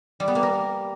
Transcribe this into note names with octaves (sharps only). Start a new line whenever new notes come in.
G3
B3
A#3
A#4